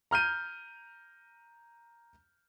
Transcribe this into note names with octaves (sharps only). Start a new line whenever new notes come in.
A#5 F6 G6 D#7